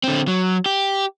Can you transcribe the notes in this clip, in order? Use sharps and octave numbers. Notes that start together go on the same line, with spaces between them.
D3 C4
F#3
G4